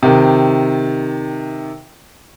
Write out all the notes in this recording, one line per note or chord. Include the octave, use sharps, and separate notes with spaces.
C3 D#3